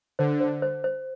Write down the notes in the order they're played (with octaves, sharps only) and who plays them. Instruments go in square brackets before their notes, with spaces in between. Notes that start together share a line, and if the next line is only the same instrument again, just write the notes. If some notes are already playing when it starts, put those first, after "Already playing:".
[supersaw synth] D3 [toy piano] C5
[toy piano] C5
C5
C5